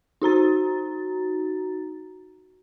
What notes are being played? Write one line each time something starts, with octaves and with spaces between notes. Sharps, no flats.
D#4 F#4 A#5 A6